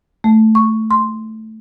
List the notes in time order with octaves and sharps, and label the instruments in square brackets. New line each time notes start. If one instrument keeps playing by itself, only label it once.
[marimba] A3
C#6
C6